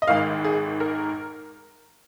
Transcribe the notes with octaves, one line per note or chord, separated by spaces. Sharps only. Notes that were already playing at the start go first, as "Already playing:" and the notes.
D#5
G#1 G#2 D#3 F5
G#4
A#4